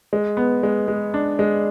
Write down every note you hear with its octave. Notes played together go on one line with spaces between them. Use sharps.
G#3
B3
G#3
G#3
D4
G#3